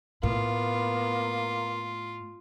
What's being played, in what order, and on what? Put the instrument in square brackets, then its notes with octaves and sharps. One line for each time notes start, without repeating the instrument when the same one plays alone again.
[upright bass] A2 [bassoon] A#3 [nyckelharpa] B3 [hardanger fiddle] F4